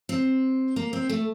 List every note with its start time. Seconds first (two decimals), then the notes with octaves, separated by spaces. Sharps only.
0.09 C4
0.76 A#3
0.93 C4
1.09 A3